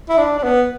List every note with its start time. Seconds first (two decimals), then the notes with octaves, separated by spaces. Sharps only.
0.09 E4
0.18 D4
0.38 D4
0.43 B3